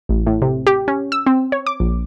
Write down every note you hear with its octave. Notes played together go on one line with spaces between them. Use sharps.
A1
A2
C3
G4
C#4
E6
C4
C#5
D6
A#1